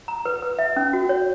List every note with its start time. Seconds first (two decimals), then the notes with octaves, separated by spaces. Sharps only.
0.08 A#5
0.25 B4
0.42 B4
0.59 E5
0.76 C#4
0.93 F#4
1.09 C#5